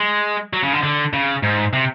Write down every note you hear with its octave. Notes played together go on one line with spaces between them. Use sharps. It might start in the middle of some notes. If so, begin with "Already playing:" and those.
Already playing: G#3
F#3
C#3
D3
D3
C#3
G#2
C3